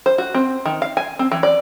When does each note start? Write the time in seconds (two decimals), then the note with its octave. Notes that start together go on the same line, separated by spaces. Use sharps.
0.06 C5
0.18 F#4
0.34 C4
0.65 D#3
0.82 F5
0.97 G#5
1.19 C4
1.32 E3
1.43 D5